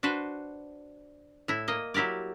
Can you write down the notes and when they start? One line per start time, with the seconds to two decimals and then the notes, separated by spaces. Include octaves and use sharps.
0.03 D4 F#4 B4 C5
1.48 A2 E4
1.68 A#3 D#5
1.94 F#3 E4 G4 A#4 D5